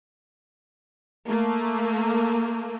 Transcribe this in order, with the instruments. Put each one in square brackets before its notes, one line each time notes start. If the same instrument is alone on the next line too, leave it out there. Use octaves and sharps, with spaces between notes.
[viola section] A3 A#3